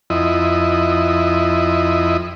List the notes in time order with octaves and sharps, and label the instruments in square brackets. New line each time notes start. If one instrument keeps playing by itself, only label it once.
[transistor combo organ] F2 E4 D#5